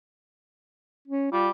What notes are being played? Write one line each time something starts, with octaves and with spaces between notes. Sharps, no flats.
C#4
G3 F4